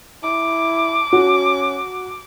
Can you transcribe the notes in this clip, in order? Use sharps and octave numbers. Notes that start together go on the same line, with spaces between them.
E4 D6
C#4 F#4